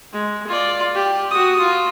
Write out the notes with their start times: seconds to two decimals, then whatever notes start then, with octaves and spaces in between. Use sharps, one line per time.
0.13 G#3
0.47 F4 D5
0.95 G4
1.31 F#4 D#6
1.60 F4